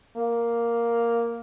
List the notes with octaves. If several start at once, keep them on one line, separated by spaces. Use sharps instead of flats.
A#3